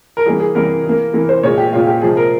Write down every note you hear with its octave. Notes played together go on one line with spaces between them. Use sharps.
A#4
E3 G3 A#3 G#4
G#4
E3 G3 A#3 A#4
E3
A#3
E3 A#3
C5
A#2 G#3 C#5
G4
A#2 G#3 F4
G4
C3 F3 G#3 G#4
A#4